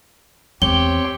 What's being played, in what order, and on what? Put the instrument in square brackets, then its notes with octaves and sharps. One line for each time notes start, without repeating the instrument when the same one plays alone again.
[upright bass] E2 [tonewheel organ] C4 C#5 G5 [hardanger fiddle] G4 [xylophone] G7